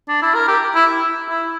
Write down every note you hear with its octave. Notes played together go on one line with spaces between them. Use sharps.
D4
E4
A#4
G4
E4
E4